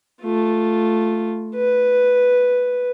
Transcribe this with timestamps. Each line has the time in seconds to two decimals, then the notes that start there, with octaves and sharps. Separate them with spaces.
0.22 A3 F4
1.55 B4